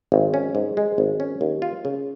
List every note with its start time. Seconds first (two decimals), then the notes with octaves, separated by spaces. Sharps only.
0.12 G#1
0.34 C#4
0.55 G#2
0.77 G#3
0.98 G#1
1.20 C#4
1.41 D#2
1.62 F4
1.85 C#3